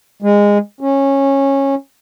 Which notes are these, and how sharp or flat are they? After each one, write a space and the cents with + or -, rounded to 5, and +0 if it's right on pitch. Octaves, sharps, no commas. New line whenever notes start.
G#3 -20
C#4 -15